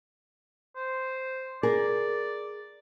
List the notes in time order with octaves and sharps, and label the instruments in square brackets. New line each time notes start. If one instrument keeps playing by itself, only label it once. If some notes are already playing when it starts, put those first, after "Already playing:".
[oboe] C5
[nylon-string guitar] G#4 A#4 [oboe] D5